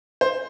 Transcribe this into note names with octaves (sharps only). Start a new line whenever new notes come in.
C5